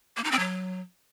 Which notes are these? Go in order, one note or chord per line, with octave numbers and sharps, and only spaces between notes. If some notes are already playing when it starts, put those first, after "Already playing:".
A#3
D#4
C4
F#3